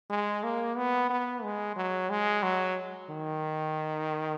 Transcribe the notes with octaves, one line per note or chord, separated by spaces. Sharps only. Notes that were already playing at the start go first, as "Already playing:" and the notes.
G#3
A#3
B3
B3
G#3
F#3
G#3
F#3
D#3